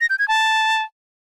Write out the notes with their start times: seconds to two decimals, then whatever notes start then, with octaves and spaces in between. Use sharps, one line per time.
0.01 A#6
0.10 G6
0.19 G#6
0.28 A5